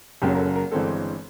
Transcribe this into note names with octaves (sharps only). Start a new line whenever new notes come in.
F#1 F#2 C#3 F#3 A#3 G4
A#4
A4
A#4
G1 G2 E3 G#3 C4 A4